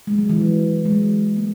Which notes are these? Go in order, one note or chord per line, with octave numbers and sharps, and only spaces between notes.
G#3
F#3
E3
F#3
G#3
F#3
A#3